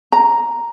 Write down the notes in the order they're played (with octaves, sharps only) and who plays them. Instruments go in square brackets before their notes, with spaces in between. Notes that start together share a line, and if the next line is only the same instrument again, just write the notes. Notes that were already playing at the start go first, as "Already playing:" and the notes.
[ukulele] A#5